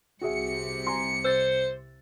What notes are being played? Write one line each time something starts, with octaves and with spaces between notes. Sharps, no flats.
C2 C3 F#4 G#4 E5 C#7
G#5 A#5 C6
C5 E6 A6